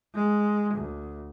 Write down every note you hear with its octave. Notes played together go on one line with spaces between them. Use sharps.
G#3
D2